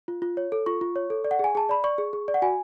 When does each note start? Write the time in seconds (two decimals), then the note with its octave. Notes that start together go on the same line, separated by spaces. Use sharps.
0.08 F4
0.22 F4
0.37 C#5
0.52 A4
0.66 F4 C#6
0.81 F4
0.96 C#5
1.10 A4
1.24 D5
1.31 F#5
1.39 G#4 G#5
1.55 G#4 A5
1.69 D5 B5
1.84 D5 C#6
1.98 G#4
2.13 G#4
2.28 D5
2.34 F#5
2.42 F#4 G#5